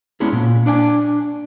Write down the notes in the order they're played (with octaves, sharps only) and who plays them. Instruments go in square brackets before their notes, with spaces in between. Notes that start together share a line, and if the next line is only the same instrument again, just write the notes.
[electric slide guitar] G#3 B3 C#4 D4 E4 G#4
A#2
D4 D5 F#5 G#5